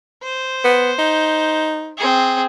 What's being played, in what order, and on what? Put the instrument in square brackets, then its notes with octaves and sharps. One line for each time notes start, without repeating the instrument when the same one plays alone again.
[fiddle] C5
[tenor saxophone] B3
D#4
[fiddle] C4 G#4